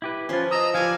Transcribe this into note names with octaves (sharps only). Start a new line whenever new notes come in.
E4 G4 B4
F3 C#4 F4 B4 C6
D#5 A#5 D#6 E6
F3 F4 G4 B4 D5 F5 G#5